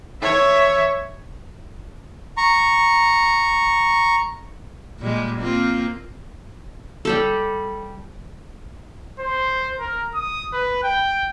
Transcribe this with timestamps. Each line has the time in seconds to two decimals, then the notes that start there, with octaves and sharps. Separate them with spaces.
0.22 C#5 E5
2.37 A#5 C#6
4.99 A#2 G3 G#3
5.39 A#3 C4 F4
7.05 G3 G4 A4
9.19 C5
9.79 A#4
10.14 D#6
10.53 B4
10.83 G5